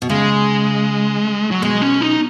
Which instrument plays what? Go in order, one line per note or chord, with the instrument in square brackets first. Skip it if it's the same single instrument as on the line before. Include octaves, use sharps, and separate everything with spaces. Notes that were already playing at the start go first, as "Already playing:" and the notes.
[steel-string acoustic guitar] B2
[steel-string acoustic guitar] C#3 [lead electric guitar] G#3
[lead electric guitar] F#3
[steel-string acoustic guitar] B2 [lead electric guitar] G#3
[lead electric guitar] C#4
D#4